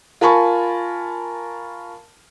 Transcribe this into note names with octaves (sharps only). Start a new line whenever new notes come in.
F4 A#4 G#5 A5 B5 C#6